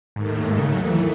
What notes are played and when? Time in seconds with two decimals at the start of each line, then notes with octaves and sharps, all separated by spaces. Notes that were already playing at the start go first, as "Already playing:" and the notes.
0.16 D#2 G#2 D#3 A3
0.29 A2
0.41 G#2
0.59 C#3
0.73 F#3
0.87 E3